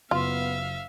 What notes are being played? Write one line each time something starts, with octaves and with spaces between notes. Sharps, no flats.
F#1 B3 F4 E5 F5